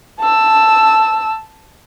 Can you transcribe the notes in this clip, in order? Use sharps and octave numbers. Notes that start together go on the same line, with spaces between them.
A5 E6